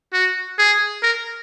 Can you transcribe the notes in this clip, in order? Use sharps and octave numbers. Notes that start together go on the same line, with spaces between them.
F#4
G#4
A#4